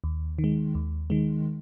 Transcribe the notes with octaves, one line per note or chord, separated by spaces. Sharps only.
D#2
D#3
G#3
D#2
D#3 G#3